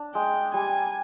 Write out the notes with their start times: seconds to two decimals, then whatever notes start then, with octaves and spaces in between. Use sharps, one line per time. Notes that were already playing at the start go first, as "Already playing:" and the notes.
Already playing: D4
0.15 G#3 G5
0.54 G3 G#5